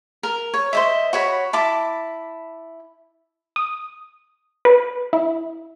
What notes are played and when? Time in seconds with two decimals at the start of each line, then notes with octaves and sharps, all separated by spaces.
0.23 A#4
0.54 C#5
0.73 C5 D#5 E5
1.13 F#4 C#5 B5
1.53 E4 A5 B5 D6
3.56 D#6
4.65 B4
5.13 E4